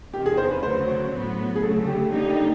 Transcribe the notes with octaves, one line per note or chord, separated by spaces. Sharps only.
E2 C3 D#3 G4
G#4
C5
B4
D2 C#3 F#3 C5
A2 F#3 B3
G#4
D2 C#3 F#3 A3 A4
G4
D3 G3 A#3 D#4 G4
G4